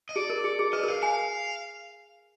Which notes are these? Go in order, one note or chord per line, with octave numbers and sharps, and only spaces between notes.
D#5
G#4 D5
A#4
G#4
G#4
B4 D#5
A#4
F5
F5 G#5